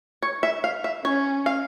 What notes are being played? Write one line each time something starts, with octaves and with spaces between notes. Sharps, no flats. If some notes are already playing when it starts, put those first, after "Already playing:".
C#5
E5
F5
E5
C#4 C#5
F5